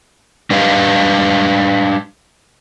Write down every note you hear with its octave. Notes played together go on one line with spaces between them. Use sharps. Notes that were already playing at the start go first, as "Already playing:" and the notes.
G3 D4 G4 B4 D#5 F5